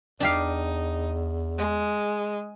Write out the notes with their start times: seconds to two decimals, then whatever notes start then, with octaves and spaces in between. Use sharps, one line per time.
0.20 E2 D4 D#4 G4 F5
1.58 G#3